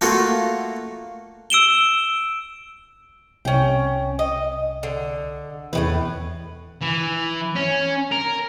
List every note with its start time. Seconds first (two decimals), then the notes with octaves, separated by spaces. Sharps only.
0.01 A3 A#3 F4 F#4 A4
1.50 E6 D7 E7 G7
3.45 C2 C#4 G5
4.19 D#5
4.83 D3
5.73 E2 A2 D#3 B4
6.81 E3
7.56 C#4
8.11 A#4